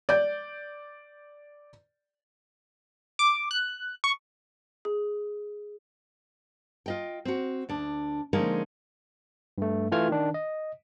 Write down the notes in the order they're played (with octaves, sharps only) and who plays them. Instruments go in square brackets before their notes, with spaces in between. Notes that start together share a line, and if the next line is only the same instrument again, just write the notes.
[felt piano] D5 G6
[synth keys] D6
F#6
C#6
[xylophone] G#4
[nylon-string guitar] F4 D#5 G5
C4 F#4
D2 D4
D3 F3 G#3 A#3 C#4 D#4
[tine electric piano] G2 A3
E3 A3 F4 F6 G#6
D#3 D4
D#5